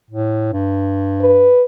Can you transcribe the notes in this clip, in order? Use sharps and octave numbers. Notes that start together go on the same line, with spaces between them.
A2
G2
B4